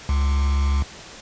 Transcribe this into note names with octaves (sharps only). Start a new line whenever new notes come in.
C#2